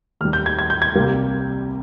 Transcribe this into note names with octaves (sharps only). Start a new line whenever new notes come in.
D#2 D#3 G3 F6
G6
G#6
G#6
G6
G#6
C2 C3 G3 A#3